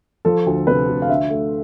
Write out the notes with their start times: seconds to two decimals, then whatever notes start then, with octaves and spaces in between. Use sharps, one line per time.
0.25 F3 A4
0.47 D2
0.67 C3 B4
0.88 D2
1.02 F5
1.10 D3 E5
1.30 A3